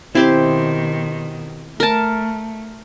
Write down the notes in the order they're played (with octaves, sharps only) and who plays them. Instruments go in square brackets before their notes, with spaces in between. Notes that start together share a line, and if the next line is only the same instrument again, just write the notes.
[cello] B2 D#3 [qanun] C4 G4 C5 [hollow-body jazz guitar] E4
[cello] A3 [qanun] A#4 A5